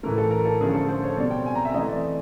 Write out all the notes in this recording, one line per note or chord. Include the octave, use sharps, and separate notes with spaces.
A2 E3 A3 A#4
A4
A#4
A4
D3 F3 A3 C#4 G#4
A4
C5
C#5
B2 G3 C4 D5
G5
G#5
A#5
E5
E3 A3 C4 D#5
D5